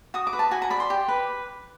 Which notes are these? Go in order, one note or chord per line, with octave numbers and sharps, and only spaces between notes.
F#4 D#6
D6
B4
A5
F#4 G#5
A#5
D5 B5
C6
G4
B4